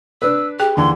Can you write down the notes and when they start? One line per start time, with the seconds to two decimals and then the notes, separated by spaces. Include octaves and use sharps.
0.22 D4 B4 E6
0.60 G4 G#4 G5
0.76 D#2 D3 E3 C6